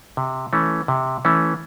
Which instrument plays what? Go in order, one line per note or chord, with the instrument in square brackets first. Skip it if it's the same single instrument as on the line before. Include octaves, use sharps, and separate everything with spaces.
[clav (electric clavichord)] C3
E3 A3 C#4
C3
E3 A3 C#4